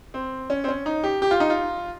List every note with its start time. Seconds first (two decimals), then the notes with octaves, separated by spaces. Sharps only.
0.14 C4
0.50 C#4
0.64 C4
0.68 C#4
0.86 D#4
1.04 G4
1.22 G4
1.31 F4
1.40 D#4
1.50 F4